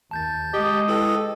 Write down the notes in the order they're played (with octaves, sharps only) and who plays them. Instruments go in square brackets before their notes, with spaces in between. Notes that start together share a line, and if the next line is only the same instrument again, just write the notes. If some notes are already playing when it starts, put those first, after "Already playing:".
[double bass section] D#2 [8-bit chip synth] A5 G6 A6
[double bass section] G#3 [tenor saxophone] G4 [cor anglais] D#5
[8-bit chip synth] E4 B4 G5 [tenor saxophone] A4